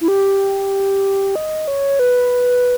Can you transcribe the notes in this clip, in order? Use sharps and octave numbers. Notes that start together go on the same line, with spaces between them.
E4
G4
D#5
C#5
B4